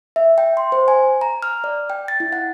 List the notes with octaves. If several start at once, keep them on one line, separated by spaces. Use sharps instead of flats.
E5
G5
C6
C5
G#5
A#5
F6
D5
G5
A6
E4
F#5